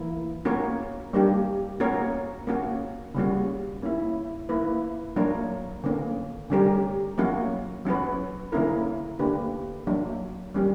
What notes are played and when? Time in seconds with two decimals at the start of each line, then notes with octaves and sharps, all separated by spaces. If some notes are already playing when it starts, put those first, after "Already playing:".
Already playing: E3 A#3 E4 A#4
0.45 A#3 C#4 F#4 A#4 C#5
1.13 G3 A#3 D4 G4
1.80 A#3 C#4 F#4 A#4 C#5
2.47 A#3 C#4 F#4
3.15 C#3 G3 A#3 C#4 F#4
3.82 A#3 C#4 E4
4.49 A#3 E4 B4
5.16 F#3 A#3 D4 A#4 C#5
5.84 D3 A#3 C#4
6.50 D3 G3 C#4 G4 A#4
7.18 F#3 A#3 C#4 F#4
7.85 F#3 C#4 F#4 B4
8.52 D3 A#3 C#4 E4 A#4
9.19 D3 A#3 D4 G4 B4
9.87 F#3 A#3 D4
10.54 G3 A#3 C#4 G4